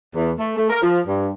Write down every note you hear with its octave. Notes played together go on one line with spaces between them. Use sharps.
E2
A3
A3
A#4
F3
G2